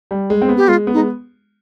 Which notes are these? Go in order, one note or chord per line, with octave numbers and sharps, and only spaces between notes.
G3
G#3
C4
B3
G4
G#3 F4
B3
D#4
G#3